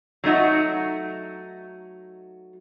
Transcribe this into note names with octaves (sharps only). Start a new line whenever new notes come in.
F#3 A3 D#4 F#4